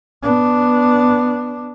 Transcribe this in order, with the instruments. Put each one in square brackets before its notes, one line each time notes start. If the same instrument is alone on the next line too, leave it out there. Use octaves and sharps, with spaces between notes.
[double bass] B3 D4